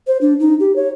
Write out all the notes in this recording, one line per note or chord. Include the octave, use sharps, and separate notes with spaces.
C5
D4
D#4
G4
C#5